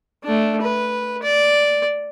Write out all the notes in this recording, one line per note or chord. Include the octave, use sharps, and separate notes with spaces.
A3 D4
B4
D5